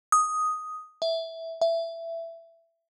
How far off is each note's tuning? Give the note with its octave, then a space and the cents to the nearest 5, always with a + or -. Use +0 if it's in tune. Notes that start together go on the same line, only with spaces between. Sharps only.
D#6 +5
E5 -5
E5 +15